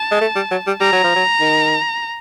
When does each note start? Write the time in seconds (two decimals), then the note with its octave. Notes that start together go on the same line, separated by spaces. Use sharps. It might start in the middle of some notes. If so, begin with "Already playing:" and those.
Already playing: A5
0.11 G#3
0.21 A3
0.35 G3
0.51 F#3
0.67 G3
0.80 G3 A#5
0.92 F#3
1.04 F3
1.15 F#3
1.40 D#3